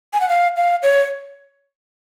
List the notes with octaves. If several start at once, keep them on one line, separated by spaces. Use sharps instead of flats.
G#5
F#5
F5
F5
C#5